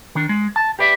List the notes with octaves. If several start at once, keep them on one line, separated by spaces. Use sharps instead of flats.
D#3 D4
G#3
A5
G4 B4 D5 E5